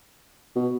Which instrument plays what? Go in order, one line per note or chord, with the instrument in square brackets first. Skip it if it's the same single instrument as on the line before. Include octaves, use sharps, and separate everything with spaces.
[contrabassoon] B2